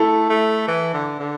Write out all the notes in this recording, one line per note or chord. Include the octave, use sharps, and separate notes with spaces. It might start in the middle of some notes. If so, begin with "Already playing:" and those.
Already playing: A3 E4 A4
A3
E3
D3
D3